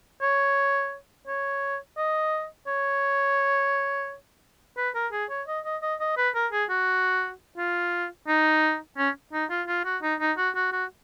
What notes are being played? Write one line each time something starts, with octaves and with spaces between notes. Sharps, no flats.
C#5
C#5
D#5
C#5
B4
A#4
G#4
C#5
D#5
D#5
D#5
D#5
B4
A#4
G#4
F#4
F4
D#4
C#4
D#4
F4
F4
F#4
D#4
D#4
F#4
F#4
F#4